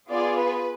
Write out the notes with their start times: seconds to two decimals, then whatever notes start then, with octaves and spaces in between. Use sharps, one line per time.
0.10 B3 F4 G#4 D5
0.39 B4